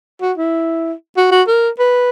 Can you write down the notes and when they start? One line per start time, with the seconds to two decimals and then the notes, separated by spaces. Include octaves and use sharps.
0.22 F#4
0.38 E4
1.17 F#4
1.32 F#4
1.48 A#4
1.79 B4